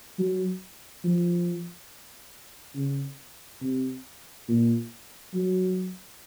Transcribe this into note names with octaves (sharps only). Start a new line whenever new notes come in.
F#3
F3
C#3
C3
A#2
F#3